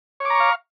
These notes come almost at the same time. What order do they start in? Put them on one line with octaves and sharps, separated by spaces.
C#5 D6 A#5 C#6 F5